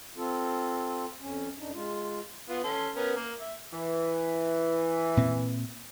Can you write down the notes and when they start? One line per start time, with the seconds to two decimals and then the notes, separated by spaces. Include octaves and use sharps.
0.17 C4 F4 A4
1.21 F2 C#4
1.59 F#2 D4 D#4
1.73 G#3 F4
2.49 B3 F4
2.64 C#4 A4 C6
2.96 B3 C#4 A#4
3.16 A#3
3.39 E5
3.72 E3
5.17 A#2 C4